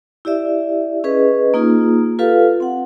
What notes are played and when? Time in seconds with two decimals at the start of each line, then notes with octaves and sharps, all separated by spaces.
0.25 E4 G4 D5 E5
1.04 C#4 G#4 B4 D#5
1.54 A#3 D#4 F4 G#4
2.19 F4 G4 A4 B4 F5
2.60 C4 F#5